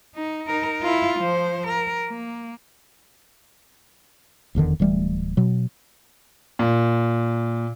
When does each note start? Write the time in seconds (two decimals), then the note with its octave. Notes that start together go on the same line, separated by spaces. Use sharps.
0.15 D#4
0.47 D#4 A#4
0.82 E4 F4
1.20 F3 C5
1.68 A#4
2.09 A#3
4.55 F1 E2 D3 D#3
4.80 D1 E3 G3 A3
5.37 B2 F#3
6.59 A#2